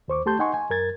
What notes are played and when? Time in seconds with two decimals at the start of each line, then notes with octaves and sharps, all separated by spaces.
0.08 D#2 C5 C#6 D6
0.26 A3 G4 A5 C6 G6
0.39 D#4 D#5 F#5 G#5 C6 C#6
0.54 G#5
0.70 F#2 A#4 G#6 A6